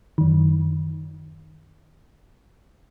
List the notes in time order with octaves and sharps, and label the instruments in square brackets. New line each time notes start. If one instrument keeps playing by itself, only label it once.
[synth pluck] F#2 D#3